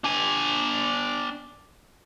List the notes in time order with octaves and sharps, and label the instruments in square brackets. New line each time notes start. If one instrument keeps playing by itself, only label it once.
[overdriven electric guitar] D4 G#5